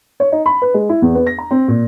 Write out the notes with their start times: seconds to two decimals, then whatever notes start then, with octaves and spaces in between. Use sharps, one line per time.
0.20 C#5
0.32 D#4
0.46 B5
0.62 B4
0.74 G#3
0.89 E4
1.02 E2
1.15 B3
1.27 A#6
1.38 A#5
1.51 C4
1.68 A#2